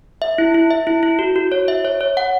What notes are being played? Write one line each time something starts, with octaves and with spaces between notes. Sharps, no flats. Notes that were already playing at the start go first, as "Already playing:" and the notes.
E5
E4
E4
E5
E4
E4
F#4
F#4
C#5
E5
C#5
C#5
F#5